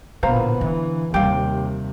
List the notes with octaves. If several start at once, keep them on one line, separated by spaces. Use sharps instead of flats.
A1 A#2 D3 B3 C5 F5 A#5
D3 E3
D#2 C3 G3 G4 F5